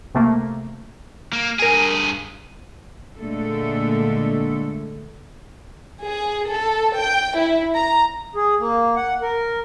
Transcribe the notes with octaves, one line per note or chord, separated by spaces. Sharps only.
C3 A3 A#3
A#3
G2 G#4 A#4 G#5
A#2 D3 G#3 A3 A4
G#4
A4
G5
E4
A#5
G#4
A#3
F#5
A#4